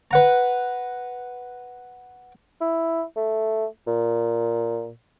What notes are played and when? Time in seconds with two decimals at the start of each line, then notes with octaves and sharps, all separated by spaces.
0.11 B4 F#5 A#5
2.61 E4
3.16 A3
3.87 A#2